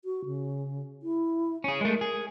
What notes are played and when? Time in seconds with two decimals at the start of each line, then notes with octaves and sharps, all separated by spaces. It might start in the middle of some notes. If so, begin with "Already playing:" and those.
0.05 F#4
0.25 C#3
1.02 E4
1.64 C#4 G#4
1.81 G#3 A3 A#4
2.01 G#4